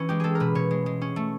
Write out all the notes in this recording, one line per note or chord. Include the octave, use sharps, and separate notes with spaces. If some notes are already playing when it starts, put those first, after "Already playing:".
Already playing: E3 C#4
G#3 G4
G#3 G#4 A4
A#4
B2 B4
B2 C#5
G#3
G#3
C#4
A3